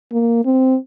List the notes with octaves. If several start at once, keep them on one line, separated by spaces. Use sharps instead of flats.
A#3
C4